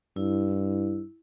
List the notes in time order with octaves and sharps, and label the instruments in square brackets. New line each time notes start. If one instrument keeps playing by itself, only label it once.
[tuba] G2 [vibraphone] E4